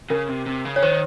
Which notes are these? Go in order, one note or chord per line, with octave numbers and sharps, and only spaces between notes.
C#3 A#4
C3
C3
C#3
C#5
D#3 C5